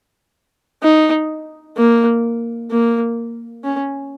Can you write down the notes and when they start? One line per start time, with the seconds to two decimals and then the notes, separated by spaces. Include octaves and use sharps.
0.83 D#4
1.77 A#3
2.71 A#3
3.64 C#4